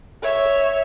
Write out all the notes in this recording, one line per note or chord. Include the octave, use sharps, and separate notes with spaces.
C#5 E5